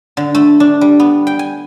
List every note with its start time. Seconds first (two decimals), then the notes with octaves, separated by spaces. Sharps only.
0.17 D3
0.35 A3
0.60 D4
0.81 G3
1.00 B3
1.27 G5
1.39 G#5